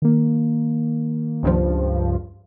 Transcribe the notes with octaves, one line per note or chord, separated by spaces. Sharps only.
D#3 A#3
C#2 G2 F3